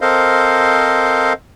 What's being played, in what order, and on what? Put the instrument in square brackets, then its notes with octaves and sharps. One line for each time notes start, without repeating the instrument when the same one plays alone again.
[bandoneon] C4 A4 A#4 C5 D#5 F5